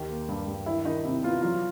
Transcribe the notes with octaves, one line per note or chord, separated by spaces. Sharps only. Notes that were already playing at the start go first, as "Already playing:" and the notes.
Already playing: D#2 D#3 G4
A#3
G2
G2
D#3 E4
D#3 D#4
C3 E4
B3 F4
F#3 F4